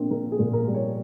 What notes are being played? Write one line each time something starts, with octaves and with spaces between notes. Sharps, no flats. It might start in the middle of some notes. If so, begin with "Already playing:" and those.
Already playing: A#1 A#2 A#3 C4
A#1 A#4
G#4
A#2
A#4
G3
C#5